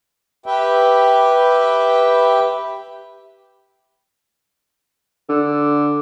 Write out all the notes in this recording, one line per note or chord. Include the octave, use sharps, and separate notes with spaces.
G4 B4 E5 G5
D3